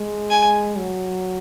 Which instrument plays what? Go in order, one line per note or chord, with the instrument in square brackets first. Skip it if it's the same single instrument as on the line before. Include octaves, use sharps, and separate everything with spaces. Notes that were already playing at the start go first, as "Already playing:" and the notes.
Already playing: [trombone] G#3
[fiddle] G#5
[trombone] F#3